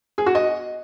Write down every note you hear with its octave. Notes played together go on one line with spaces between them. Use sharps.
G#4
F#4
D#5